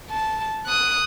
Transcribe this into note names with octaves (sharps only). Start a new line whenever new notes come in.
A5
D#6 F#6